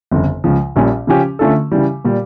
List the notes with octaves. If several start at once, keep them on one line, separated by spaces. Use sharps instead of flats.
G1 F2 C#3
C#2 C#3 F3
A#1 A#2 G3 C#4
C#3 F3 C#4 G4
D3 A3 C#4 F4 A4
C#3 E3 G3
A#2 G3